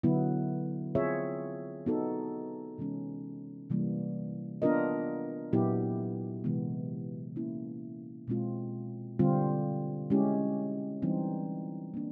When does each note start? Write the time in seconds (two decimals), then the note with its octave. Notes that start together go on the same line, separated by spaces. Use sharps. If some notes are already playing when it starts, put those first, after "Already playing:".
0.03 D3 F#3 B3 E4
0.95 C4 F4 G#4 C#5 E5
1.86 B3 D#4 F#4 A4
2.78 C3 E3 G#3 C#4
3.70 C3 E3 G3 A#3
4.62 B3 D4 F4 A#4 D#5
5.53 A#2 F#3 B3 E4 G4
6.44 C3 E3 G#3 B3
7.36 A#3 C#4 E4
8.28 B2 G#3 C4 F4
9.19 D3 G3 C4 F4
10.10 G#3 C#4 E4 G4
11.02 E3 G3 C4 D#4
11.94 A#3 D4